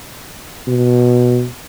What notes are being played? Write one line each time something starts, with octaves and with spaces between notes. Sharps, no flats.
B2